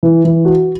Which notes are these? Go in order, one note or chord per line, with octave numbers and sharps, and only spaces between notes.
E3
E3
F#4